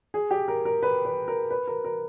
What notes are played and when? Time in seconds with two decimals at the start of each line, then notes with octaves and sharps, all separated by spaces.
0.14 G#4
0.31 G4
0.48 A#4
0.65 A#4
0.83 B4
1.05 B4
1.28 A#4
1.51 B4
1.67 A#4
1.84 A#4